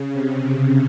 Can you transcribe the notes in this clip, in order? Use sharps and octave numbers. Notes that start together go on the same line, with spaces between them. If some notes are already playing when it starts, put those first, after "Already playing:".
Already playing: C#3
C3